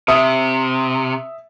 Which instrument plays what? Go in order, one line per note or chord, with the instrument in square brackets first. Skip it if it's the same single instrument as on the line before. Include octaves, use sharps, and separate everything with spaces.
[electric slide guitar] C3 [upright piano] E5 D#6